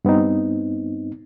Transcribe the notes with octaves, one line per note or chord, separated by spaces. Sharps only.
G2 B3 C4 D#4